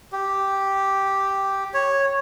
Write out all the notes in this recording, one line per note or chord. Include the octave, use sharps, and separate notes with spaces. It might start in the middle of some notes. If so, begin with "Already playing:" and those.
G4
C#5